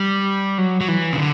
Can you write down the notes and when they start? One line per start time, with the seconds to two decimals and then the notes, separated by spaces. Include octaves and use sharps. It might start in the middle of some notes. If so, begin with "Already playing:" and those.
Already playing: G3
0.58 F#3
0.81 F#3
0.88 E3
1.13 C#3
1.18 D3